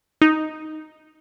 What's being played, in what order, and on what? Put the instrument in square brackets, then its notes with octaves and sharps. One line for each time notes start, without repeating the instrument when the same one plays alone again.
[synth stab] D#4